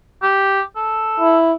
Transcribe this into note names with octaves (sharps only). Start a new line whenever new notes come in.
G4
A4
E4